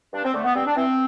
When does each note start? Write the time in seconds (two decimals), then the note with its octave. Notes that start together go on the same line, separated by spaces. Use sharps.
0.13 G2 D4
0.24 C4
0.34 D3 A3
0.44 B3
0.56 G2 C4
0.66 D4
0.75 E3 C4